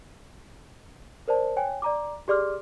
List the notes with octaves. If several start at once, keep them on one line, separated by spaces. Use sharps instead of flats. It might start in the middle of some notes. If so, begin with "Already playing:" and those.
A#4 C5 D5 A5
C#5 G5 G#5
D5 A#5 D6
G4 G#4 D5 C6 D6 F6